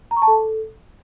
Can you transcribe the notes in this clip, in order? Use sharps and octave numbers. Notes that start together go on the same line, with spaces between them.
A#5
C#6
A5
A4